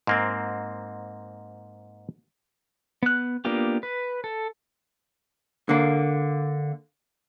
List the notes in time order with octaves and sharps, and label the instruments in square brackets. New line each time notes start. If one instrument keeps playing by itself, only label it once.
[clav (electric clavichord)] G#2 A#3 C4
[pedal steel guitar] B3 F#6
A#3 B3 D4 F4 G4
B4
A4
[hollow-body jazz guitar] D3 A#3